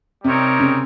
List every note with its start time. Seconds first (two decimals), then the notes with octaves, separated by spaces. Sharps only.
0.24 C3 G3 C4 D#4 A#4 C#5
0.60 C#3